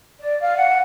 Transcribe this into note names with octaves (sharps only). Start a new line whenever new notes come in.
D5
F5
F#5